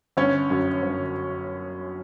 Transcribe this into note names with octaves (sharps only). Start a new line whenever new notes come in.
G1 C#4 C#5
F#2
G1